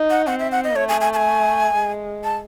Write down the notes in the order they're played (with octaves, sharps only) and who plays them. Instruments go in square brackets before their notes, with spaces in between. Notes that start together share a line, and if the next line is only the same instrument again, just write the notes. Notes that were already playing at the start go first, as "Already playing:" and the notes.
Already playing: [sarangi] D#4
[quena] F#5
[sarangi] C4 [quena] F#5
[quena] E5
F#5
D#5
[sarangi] A3 [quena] C#5
[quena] G#5
G#5
A5
G#5
[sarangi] G#3
[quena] A5